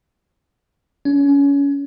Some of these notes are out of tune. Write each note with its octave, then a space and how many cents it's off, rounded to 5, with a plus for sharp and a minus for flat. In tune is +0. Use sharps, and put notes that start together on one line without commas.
C#4 +25